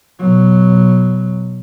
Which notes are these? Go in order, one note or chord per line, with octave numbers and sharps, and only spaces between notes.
B2 F#3